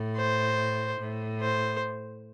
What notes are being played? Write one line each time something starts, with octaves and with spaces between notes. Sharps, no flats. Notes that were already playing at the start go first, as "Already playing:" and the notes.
Already playing: A2
C5
A2
C5